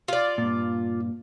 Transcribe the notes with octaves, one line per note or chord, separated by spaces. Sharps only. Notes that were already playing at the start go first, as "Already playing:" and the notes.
F4 D5
G2 A#2